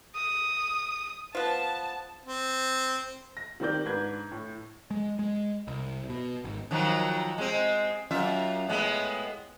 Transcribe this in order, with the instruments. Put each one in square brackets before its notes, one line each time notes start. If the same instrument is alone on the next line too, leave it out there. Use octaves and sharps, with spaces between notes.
[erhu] D#6
[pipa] F3 B3 [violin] A5
[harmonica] C4
[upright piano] A#6
D#3 G3 C4 A#4 D5 G6
G#2 D4 B4 G#6
A2
[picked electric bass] G#3
G#3
C2
B2
G#1
[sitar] D#3 F3 F#3
G#3 C4
F#2 F4 E5
A2 G#3 B3